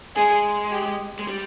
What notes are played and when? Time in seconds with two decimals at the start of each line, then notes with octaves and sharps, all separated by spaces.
0.16 G#3 G#4
0.72 G4
1.19 G#3
1.28 G3